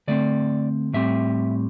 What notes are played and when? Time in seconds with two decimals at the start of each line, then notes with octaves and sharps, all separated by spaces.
0.08 D3 A3 C4 D5
0.93 A2 G3 C4 E5